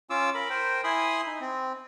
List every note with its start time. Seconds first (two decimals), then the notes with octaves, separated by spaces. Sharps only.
0.10 C#4 F4 D6 E6
0.35 A#4 B5
0.50 A#4 C5 G5
0.84 E4 G#5 B5 C6 D#6
1.26 D#4
1.40 C4